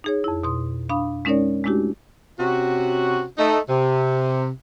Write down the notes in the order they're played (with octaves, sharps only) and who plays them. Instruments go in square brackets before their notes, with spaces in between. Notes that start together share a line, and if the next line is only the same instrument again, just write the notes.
[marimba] D#4 G#4 C#5
F2 E4
B2 C6 D#6
D4 F5 B5 D#6
G#3 C#4 D#4 A#4 C#5 D5
G#3 A3 D4 E4 F#4 G4
[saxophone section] C3 C#4 F#4
A3 D#4
C3